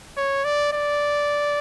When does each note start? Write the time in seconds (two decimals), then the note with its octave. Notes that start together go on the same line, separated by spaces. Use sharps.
0.17 C#5
0.44 D5
0.73 D5